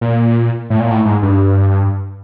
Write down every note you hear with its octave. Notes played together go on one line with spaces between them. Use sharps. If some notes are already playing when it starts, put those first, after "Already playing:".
A#2
A2
A#2
A2
G#2
G2